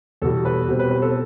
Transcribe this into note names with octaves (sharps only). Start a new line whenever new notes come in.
E2 B2 G3 A4
B4
B2 G3 C4
B4
B4
A4 C5